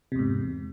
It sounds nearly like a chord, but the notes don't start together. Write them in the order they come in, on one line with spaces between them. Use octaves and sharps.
C3 E2 G#2